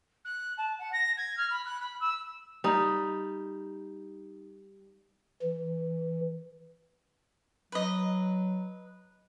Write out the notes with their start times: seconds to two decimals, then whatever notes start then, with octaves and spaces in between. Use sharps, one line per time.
0.24 F#6
0.57 A5
0.79 F#5
0.92 A#6
1.17 G#6
1.37 F6
1.50 B5
1.65 F#6
1.80 B5
2.00 E6
2.64 G3 D#4
5.42 E3
7.72 F#3 B4 D#5